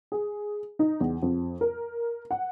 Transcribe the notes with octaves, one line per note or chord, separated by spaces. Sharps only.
G#4
D#4
E2
F2
A#4
F#5